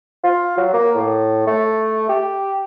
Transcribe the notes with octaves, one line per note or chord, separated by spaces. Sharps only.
F4
F#3
A#3
A2
A3
G4